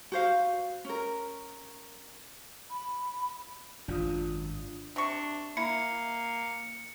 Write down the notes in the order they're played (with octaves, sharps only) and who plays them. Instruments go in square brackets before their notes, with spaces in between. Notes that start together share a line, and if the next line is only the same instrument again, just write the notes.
[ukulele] F#4 C5 F5
C#4 A#4
[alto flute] B5
[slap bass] G#1 F#2 [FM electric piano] D4 F4 D#6
[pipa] C3 C#6 [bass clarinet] D4
[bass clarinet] A#3 [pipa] E4 [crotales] C#7